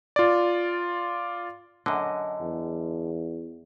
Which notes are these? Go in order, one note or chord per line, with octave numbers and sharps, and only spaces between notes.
F4 D5
F#2 D3 D#5
E2